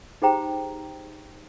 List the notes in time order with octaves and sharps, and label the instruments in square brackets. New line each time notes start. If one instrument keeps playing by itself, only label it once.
[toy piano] D#4 G4 G#4 C5 G5 A#5